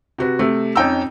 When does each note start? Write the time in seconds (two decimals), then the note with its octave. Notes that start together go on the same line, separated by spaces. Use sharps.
0.18 C3 F#4 B4
0.39 C3 A3
0.75 F2 C#4 D#4 G5 A#5 E6